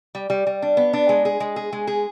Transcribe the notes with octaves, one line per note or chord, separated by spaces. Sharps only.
G3
G3
G3
D4
B3
D4
G#3
G#4
G#3
G#4
G#3
G#4